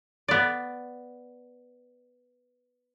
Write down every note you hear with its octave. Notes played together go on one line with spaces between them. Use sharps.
B3 D5